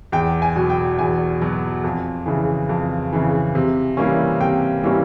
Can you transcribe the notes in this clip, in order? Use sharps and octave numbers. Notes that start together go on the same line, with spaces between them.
E2 G5
G#5
B2 F#3
G5
E2 G#5
B2 F#3
F2
C#3 E3
F2
C#3 E3
C3
E3 G3 A#3 C#4
C3 G5
E3 G3 A#3 C#4